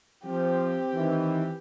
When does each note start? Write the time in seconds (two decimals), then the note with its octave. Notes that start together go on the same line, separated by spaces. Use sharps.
0.25 F3 C4 G4
0.93 D#3 E3